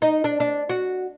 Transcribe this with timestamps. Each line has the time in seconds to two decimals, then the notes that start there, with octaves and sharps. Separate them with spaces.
0.02 D#4
0.24 D4
0.40 D4
0.69 F#4